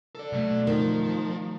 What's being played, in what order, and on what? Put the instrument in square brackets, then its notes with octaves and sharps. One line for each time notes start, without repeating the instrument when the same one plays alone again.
[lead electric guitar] A4 D5
[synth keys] B2 F#3 A3
[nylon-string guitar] D#3 [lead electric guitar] F3